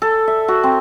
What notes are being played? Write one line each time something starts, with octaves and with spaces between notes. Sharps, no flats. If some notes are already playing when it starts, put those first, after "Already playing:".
A4
E5
F#4
C4